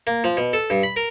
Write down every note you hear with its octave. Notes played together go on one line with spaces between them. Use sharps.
A#3
F3
B2
A4
G2
B5
A#4